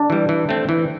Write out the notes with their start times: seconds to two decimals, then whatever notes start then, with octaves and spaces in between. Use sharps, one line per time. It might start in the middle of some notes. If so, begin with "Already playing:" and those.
Already playing: D4
0.10 E3 G3
0.29 E3
0.49 A3 C4
0.69 E3